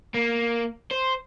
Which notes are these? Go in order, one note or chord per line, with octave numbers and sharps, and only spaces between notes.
A#3
C5